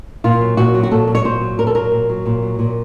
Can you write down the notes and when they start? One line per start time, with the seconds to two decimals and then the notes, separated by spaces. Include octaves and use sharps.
0.24 A#2 F4
0.41 F#3
0.57 A#2 F#4
0.74 F#3
0.83 F#4
0.91 A#2 A4
1.08 F#3
1.15 C#5
1.25 A#2 C5
1.41 F#3
1.58 A#2 A#4
1.67 A4
1.75 F#3 A#4
1.92 A#2
2.09 F#3
2.26 A#2
2.43 F#3
2.59 A#2